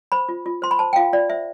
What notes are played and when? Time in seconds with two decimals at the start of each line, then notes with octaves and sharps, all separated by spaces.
0.12 C5 B5
0.29 F4
0.46 F4
0.62 C5 C6
0.71 B5
0.79 C5 A5
0.93 G5
0.96 F4 F5
1.13 F4 D5
1.30 C5 E5